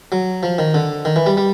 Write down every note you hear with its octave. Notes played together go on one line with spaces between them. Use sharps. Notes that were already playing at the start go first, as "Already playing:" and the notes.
F#3
F3
D#3
D3
D#3
E3
G3
G3